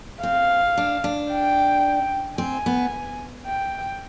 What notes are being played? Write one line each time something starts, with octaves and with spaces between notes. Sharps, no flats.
C4 F5
D4
D4
G5
C4 G#5
B3
G5